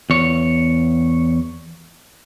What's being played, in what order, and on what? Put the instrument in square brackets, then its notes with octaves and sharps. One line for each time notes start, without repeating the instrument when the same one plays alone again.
[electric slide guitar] E2 C#5